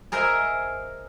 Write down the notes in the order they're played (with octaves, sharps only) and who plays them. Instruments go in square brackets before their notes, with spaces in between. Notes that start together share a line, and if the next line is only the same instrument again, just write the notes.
[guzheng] G#4 A#4 C5 D#5 E5 G#5